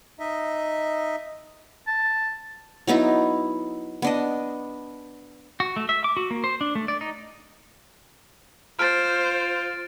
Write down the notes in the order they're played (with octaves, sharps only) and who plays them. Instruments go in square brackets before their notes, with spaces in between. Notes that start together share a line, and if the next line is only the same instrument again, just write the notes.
[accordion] D#4 D#5 E5
[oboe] A5
[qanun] F#3 B3 D#4 E4
B3 D4 D#5
[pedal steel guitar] F#4
A3
E5
D6
F#4
A#3
C5
D4
A3
D5
D#4
[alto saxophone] F4 [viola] C5 [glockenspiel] F6 [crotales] A6 D7